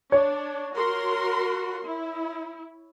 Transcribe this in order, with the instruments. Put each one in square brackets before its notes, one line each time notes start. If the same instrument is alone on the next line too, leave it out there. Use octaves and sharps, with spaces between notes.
[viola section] D4 [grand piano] C#5
[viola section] F#4 A#4 C6
E4